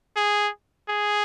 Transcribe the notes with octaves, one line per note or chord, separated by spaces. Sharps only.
G#4
G#4